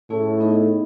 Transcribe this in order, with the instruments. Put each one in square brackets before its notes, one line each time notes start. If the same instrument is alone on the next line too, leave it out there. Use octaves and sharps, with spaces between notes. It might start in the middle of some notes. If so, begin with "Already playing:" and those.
[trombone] A2 [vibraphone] A3 C#4 E4 G#4
[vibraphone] B3 D#4 G#4 D#5